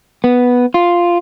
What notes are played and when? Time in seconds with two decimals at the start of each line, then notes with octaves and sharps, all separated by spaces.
0.24 B3
0.74 F4